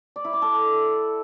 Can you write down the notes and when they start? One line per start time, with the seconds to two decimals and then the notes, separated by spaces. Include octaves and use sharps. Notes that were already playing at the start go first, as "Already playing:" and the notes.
0.16 D5
0.25 E4
0.33 D5
0.42 A4